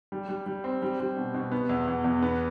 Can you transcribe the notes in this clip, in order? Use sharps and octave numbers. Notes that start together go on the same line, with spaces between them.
G3
G3
G3
C4
G3
G3
B2
B2
B3
E2
E2
E2
B3